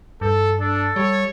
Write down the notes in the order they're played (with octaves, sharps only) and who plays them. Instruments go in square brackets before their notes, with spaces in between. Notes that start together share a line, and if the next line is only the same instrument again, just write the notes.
[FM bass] G2 [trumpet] A4
[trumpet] D4 [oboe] A4
[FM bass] G3 [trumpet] C#5